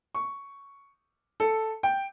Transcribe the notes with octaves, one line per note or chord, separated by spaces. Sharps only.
C#6
A4
G5